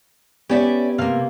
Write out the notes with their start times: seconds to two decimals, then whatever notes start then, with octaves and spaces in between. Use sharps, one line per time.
0.49 B3 C#4 G4 D5 E5
0.98 C3 A#3 F5